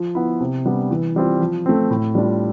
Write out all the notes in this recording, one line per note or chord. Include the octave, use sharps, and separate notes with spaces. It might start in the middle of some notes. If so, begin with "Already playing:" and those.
Already playing: F3
B3 E4
C3
G3 B3 D4
E3
G3 C4 F4
F3
A3 C4
A2
G3 D4 F4